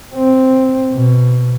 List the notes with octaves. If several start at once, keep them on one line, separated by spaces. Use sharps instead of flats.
C4
B2